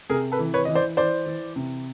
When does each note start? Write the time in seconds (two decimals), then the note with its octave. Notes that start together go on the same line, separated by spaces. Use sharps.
0.10 C3 G#4 A#4
0.32 A4 B4
0.39 E3
0.54 B4 C#5
0.65 E3 D#5
0.75 C5 D5
0.97 E3 C5 D5
1.26 E3
1.56 C3